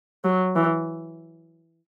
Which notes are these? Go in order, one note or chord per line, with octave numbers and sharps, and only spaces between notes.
F#3
E3